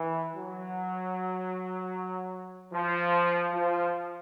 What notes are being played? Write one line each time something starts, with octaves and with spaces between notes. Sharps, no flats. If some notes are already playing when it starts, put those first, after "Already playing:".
Already playing: E3
F#3
F3
F3